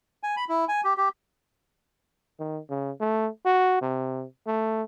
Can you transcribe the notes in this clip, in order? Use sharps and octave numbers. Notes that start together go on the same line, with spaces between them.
G#5
B5
E4
G#5
G4
G4
D#3
C#3
A3
F#4
C3
A3